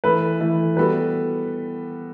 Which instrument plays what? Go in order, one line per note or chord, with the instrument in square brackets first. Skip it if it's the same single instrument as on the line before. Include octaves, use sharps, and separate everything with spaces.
[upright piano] E3 A3 E4 A4 [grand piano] B4
[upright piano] E3 A3 E4 A4
[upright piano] G3 B3 F#4 A4 [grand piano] B4